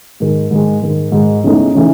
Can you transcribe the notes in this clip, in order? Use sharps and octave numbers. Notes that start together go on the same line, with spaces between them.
G#2 D#3 G#3
G#2 D#3 G#3
G#2 D#3 G#3
G#2 D#3 G#3
E2 C#3 E3 A3 D#4
C#3 E3 A3 D#4